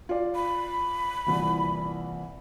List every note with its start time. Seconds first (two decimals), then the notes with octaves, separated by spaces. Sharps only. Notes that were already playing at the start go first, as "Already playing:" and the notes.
0.09 F4 D5
0.35 B5
1.26 C2 A#2 E3